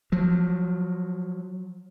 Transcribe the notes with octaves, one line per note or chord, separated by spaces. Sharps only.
F3 F#3